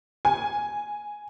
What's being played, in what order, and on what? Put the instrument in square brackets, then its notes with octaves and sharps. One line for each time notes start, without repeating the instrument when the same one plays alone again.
[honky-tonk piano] G#5